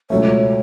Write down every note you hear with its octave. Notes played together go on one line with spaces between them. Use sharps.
C#2 B2 F#3 A3 C#5